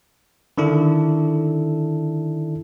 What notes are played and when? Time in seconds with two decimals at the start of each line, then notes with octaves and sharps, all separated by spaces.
0.58 D3 D#3 D4 E4 A4